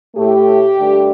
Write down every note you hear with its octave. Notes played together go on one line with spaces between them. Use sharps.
A2 A3 G4
G2 D3 A3